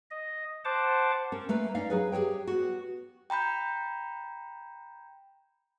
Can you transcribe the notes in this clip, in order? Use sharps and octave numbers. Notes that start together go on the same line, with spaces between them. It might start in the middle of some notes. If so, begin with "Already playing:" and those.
D#5
C5 F#5 A5 D6
C#4 A#4
A3 A#3 B4
C#4 D#4 D5 F5
F#3 G#4 B4
G4 G#4 C5 C#5 G5
B3 F#4
G5 A#5 B5 G6